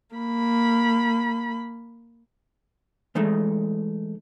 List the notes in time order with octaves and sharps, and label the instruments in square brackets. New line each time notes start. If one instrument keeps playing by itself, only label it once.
[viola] A#3 B5
[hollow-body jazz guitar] E3 G#3 A3 D#4